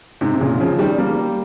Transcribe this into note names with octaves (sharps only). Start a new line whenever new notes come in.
G#2 C3
C3
A#2 C#3
C#3 F3
D#3 G3
G3 A#3